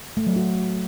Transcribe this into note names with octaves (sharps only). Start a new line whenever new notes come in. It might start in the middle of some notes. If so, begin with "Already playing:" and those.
A3
F#3
F#4